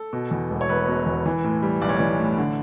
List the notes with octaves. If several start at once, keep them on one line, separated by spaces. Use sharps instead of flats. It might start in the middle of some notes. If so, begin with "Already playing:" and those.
Already playing: A4
B2
E2
E1
C#5
E1 B4
B2
E2
E3
A2
G3
B1 D5
C#5
E3 D5
A2
D3